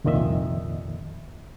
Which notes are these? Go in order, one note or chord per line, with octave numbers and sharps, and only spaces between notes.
C2 F2 A#2 D#3 D#5 E5